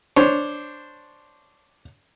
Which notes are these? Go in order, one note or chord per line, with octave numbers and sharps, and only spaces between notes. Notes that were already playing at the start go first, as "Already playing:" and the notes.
D4 C5 C#5